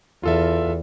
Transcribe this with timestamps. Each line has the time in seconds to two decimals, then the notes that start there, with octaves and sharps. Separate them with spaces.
0.23 E2 F4 A4 E5